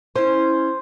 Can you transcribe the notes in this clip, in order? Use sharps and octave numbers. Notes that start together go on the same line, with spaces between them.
C#4 E4 C5